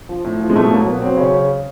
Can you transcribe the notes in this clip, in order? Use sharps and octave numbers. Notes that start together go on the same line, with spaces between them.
F3
A2
F3
G#3
B2 A3
F#3 A#3
F#3 B3
F#3 C4
C#3 C#4